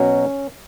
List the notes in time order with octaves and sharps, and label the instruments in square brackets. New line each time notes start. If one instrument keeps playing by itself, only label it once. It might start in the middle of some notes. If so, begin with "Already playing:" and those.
Already playing: [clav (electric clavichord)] B2 F#3 C#4